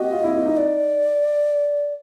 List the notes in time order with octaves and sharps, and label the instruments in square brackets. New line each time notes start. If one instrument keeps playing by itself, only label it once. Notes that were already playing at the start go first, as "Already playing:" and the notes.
Already playing: [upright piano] F#4 G4 [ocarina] D#5
[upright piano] F4
E4
E4
D#4
[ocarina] D5